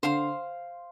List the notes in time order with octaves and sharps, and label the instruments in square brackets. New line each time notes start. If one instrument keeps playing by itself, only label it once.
[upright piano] D3 [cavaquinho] C5 F5 C6